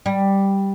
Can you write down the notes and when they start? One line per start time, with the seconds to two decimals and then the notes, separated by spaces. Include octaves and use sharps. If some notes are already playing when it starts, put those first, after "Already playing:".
0.06 G3